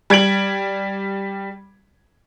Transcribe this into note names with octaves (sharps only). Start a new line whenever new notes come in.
G3 G#6 D7 F#7